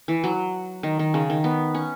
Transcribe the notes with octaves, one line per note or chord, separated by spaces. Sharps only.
E3
F#3
D#3
D#3
C#3
D#3
B3
C#4